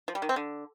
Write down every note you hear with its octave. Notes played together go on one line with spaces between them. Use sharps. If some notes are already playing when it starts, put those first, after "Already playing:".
F3
G3
D#3
C4
D3